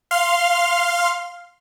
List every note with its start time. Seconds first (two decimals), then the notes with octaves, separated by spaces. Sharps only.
0.11 F5 C6 F6